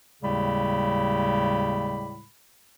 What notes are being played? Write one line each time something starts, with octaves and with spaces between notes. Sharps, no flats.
D#2 A2 C#3 G3 G#3 B5